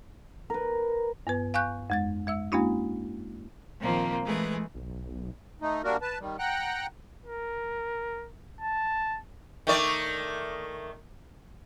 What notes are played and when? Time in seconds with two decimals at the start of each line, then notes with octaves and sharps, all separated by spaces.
0.50 A#4 B4
1.27 G2 B3 B4
1.54 F5 G#5 C#6 F#6 G6
1.90 F2 G#3 A6
2.27 G#3 E5 E6
2.52 G#3 A#3 C#4 D4 E4 F#4
3.80 A#2 D#3 F3 A#3 C4
4.25 E3 G#3 A3 G#4 B4
4.75 B1
5.61 A3 D#4
5.84 G3 A#3 D4 F#4 A#4
6.02 B4 A5
6.19 D#3 G3
6.39 F#5 G5 A#5 F#6
7.26 A#4
8.61 A5
9.67 D#3 A3 D5